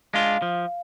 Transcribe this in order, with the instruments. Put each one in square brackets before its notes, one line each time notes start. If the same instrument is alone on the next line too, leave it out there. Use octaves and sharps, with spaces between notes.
[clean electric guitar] G#3 D4 F4 [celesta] F5
[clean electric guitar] F3